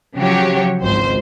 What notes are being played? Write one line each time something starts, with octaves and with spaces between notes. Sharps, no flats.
C#3 F3 F#3 F#4 G4 C#5
G#1 C#2 C5 C6